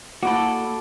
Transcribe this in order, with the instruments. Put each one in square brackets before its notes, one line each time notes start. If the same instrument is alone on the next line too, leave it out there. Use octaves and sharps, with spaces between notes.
[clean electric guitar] A#3 E4 B5 [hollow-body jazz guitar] F#4 [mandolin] A4 D5